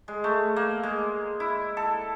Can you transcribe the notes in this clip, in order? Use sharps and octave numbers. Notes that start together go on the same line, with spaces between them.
G#3
A3
A#3
G#3
E4
A4